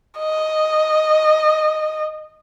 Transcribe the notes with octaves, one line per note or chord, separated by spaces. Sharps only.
D#5